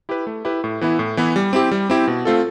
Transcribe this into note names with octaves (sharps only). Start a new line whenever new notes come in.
E4 G4 B4
A3
E4 G4 B4
A2
E3 B3 E4
A2
E3 B3 E4
G3
C4 E4 G4
G3
C4 E4 G4
B2
A3 C4 F4 A4